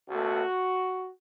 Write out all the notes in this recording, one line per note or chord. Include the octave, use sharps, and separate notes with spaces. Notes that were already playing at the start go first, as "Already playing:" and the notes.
C#2 B2 A3 F#4